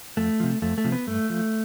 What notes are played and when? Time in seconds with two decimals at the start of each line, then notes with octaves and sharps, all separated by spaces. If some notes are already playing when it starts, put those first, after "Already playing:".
0.17 F2 A3
0.40 C3 F3
0.62 F2 A3
0.78 A3
0.84 C3 F3
0.92 B3
1.07 G2 A3
1.30 F3